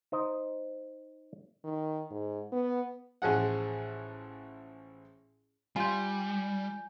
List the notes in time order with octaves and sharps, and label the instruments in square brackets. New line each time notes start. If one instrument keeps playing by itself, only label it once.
[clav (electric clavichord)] D#4 C5 D#5
[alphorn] D#3
G#2
B3
[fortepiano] A1 F3 G#4 F#5
[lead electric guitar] G3 [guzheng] F4 [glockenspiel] G#5 G6